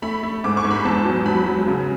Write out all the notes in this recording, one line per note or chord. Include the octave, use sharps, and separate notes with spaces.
A3 B5
A3
G#2 D6
C#6
G#2
B5
E2 A5
F#3
F#3 B5
F#3
C#3